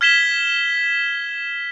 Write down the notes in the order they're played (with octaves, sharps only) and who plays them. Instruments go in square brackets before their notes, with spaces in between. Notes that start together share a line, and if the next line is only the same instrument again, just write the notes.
[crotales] F6 G#6 B6 E7 G7